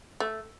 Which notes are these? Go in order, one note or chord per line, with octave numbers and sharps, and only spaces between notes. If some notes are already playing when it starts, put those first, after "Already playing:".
A3